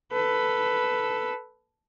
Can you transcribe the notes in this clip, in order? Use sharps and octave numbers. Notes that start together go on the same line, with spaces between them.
A4 B4